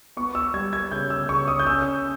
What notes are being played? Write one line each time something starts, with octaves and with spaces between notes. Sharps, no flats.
B3 C#6
E6
G3 G#6
G#6
C#3 G6
E6
C#3 C#6
D#6
G6
C#4 E6